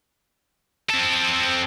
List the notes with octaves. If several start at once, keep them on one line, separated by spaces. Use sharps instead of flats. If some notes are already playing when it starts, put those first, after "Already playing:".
C4 A4